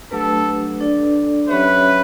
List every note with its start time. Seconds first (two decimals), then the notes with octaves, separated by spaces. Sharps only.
0.11 F#3 A3 D4 G4 A4 B4
0.80 D4 A4 D5
1.49 F#3 C#4 G4 B4 C#5 E5